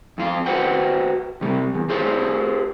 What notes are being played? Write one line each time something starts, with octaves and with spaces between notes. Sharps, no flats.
F2 F4
F#4 B4 C5 F#5 G5
C3 G3
E2
F4 G4 G#4 C5